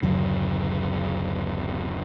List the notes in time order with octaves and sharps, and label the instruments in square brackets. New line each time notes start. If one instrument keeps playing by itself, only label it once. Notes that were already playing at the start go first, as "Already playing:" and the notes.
[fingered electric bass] D1 F#2 C#3